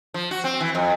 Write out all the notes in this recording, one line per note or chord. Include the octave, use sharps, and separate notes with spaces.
F3
F#4
C4
E3
F2